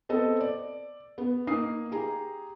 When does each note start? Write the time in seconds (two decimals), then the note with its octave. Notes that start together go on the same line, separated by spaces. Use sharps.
0.09 B3 C4 A4 D#5
0.41 D5
1.18 B3
1.47 A#3 D#4 D#6 C7
1.91 G4 G#4 A#5